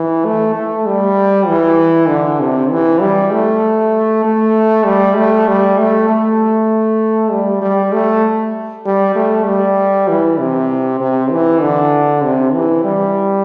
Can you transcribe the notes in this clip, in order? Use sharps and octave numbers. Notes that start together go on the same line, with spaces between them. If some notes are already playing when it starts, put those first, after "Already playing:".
Already playing: E3
A3
A3
G3
E3
D3
C3
E3
G3
A3
A3
G3
A3
G3
A3
A3
G3
G3
A3
G3
A3
G3
E3
C3
C3
E3
D3
C3
E3
G3